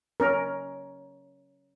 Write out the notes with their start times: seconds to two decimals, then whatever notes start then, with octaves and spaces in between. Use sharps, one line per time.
0.20 C#4 A#4